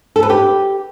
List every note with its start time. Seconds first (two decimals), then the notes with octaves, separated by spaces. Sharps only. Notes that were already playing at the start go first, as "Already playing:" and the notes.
0.16 A4
0.23 B4
0.30 G4